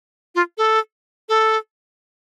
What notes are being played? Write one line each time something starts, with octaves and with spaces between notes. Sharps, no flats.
F4
A4
A4